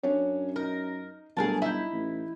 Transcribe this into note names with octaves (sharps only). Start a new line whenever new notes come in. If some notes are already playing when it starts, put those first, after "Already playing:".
F#2 C#4 D4 C#5
D#4 A#4
G1 F#3 A3 G#4 A#4 A5
D#4 E4 G6
A1